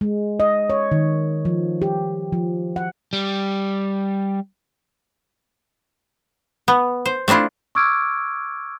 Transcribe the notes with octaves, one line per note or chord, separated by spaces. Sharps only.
G#3
D#5
C#5
D#3
F3
G4
F3
F#5
G3
B3
C5
A3 C4 D4 E4 F4
C#6 D6 E6 F6 G#6 D7